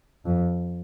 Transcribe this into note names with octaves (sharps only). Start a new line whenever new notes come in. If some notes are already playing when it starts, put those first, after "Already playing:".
F2